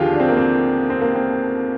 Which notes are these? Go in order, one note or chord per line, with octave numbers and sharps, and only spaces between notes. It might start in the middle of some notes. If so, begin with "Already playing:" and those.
Already playing: D#2 D3 F3 F4 G4 G#4
D4
C4
A#3
C4
C4
A#3
C4